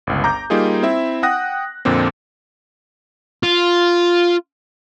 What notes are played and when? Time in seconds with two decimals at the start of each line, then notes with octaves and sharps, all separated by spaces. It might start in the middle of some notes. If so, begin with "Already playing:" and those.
0.07 G1 C#2
0.24 A#5 D6 G6
0.50 G3 A#3 D#4 F4 G#4
0.83 C4 E4 E5
1.23 F#5 G5 D#6 F#6 A#6
1.85 F2 A#2 D3 C4
3.43 F4